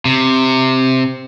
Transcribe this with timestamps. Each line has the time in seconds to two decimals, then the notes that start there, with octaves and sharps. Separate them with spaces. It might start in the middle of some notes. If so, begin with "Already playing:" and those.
0.05 C3